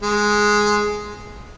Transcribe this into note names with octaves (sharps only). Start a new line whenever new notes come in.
G#3